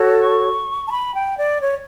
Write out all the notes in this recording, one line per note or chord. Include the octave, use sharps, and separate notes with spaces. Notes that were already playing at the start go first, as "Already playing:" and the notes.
Already playing: F#4 A4 C#5
C#6
A5
B5
G5
D5
C#5